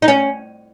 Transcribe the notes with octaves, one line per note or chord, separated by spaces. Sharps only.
D#4
C#4